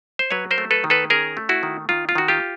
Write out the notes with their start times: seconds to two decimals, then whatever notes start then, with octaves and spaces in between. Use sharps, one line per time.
0.19 C5
0.31 F#3 B4 C#5
0.51 A#4 C5
0.58 A3
0.71 A4 B4
0.84 D#3
0.90 A4 B4
1.10 C#4 G#4 A#4
1.37 A3
1.49 E4 F#4
1.63 D#3
1.89 D#3 F4
2.09 F4
2.15 D#3 F#4
2.28 F4 G4